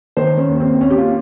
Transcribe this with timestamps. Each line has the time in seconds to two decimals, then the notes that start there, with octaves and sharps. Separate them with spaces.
0.17 D#3 C5
0.38 C#4
0.50 D#2
0.60 C4
0.81 D#2 C#4
0.90 G4
0.98 F4